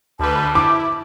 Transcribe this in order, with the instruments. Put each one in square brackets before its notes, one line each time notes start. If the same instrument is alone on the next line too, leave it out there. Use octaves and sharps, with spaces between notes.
[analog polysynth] D2 B4 [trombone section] G#2 G3 [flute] A5
[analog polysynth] E4 [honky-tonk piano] D6